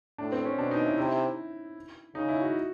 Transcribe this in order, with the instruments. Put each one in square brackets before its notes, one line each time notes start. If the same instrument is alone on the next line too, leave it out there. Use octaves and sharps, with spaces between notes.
[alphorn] A2 [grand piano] D4
[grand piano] C4
C#4
[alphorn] B2 [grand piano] D4
[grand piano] D#4
E4
[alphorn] C3 [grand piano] E4
[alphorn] C#3 [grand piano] D#4
[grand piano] E4
F#4